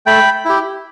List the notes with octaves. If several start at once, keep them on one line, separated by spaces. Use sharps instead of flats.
A3 G5 B5
E4 G4